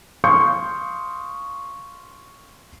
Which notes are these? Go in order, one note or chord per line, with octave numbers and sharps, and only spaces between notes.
F5 C6 C#6 D#6 G6 C#7